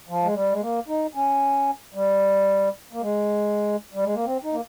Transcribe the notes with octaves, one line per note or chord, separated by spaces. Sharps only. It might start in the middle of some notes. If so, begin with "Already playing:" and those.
F3
G#3
G3
G#3
A#3
D#4
C#4
G3
A#3
G#3
G3
G#3
A#3
C4
D#4
A#3